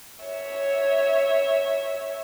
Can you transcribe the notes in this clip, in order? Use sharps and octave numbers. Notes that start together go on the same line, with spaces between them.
C#5 E5